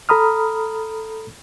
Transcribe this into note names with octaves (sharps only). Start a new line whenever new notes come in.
A4 A#5 B5 D#6 F6